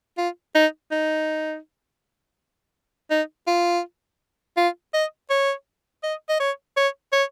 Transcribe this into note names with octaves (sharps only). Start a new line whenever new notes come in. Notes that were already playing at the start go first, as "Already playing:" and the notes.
F4
D#4
D#4
D#4
F4
F4
D#5
C#5
D#5
D#5
C#5
C#5
C#5